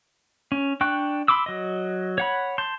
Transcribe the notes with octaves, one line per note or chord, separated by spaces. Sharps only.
C#4
D4 G5 C#6 F#6
B5 C6 D6 E6
F#3 D#5
C#5 F#5 B5
A5 C6 G6